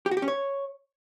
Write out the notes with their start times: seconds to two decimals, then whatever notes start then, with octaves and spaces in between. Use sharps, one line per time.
0.06 G4
0.11 F#4
0.17 G4
0.22 C#4
0.28 C#5